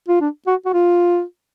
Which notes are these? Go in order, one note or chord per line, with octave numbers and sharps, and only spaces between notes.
F4
D4
F#4
F#4
F4